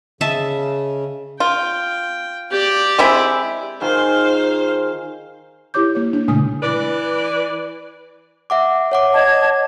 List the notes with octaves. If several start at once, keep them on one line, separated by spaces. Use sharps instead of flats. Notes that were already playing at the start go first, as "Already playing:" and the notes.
C#3 D#5 E5 A5
F4 G5
G4 D5
G#3 C4 E4
D#3 F4 G#4 C5 F5
E4 G4 C#5 D6 G6
A#3 C#5
D4
A#2 C#3 G#3 A3 G#5 D#6
E3 B4 D5
E5 F#5 D6
C#5 F#5 D6
D#5 A5 G#6